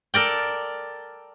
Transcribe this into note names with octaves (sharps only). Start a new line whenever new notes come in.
A4 A#4 D5 G5